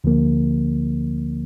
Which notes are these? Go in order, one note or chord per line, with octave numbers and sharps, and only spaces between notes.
D2 D3 F3 A#3